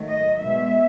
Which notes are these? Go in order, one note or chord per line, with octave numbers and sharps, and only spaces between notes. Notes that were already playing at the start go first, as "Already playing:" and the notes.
Already playing: D#3 F#3 A3
D#5
B2 G#3 B3 E5